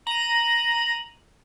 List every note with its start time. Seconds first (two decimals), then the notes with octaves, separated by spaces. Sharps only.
0.07 A#5 D#7 F#7